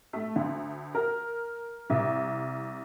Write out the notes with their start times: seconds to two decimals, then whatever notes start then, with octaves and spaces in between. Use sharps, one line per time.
0.13 A3
0.36 D2
0.95 A#4
1.90 C2